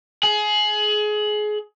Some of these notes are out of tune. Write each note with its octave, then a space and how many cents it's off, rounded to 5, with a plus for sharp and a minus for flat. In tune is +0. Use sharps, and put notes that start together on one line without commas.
G#4 +25